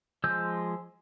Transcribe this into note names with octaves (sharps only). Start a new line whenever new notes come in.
F3 G#3 E6 G6